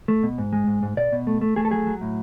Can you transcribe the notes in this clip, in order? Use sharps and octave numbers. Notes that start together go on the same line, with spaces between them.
A3
B2
G#2
G#3
G#2
G#2
B2 D5
B2
A3
A3
A3 G#4
A4
F#3 G#4
F#3
A2